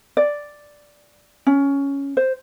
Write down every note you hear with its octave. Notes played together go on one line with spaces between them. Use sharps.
D5
C#4
C5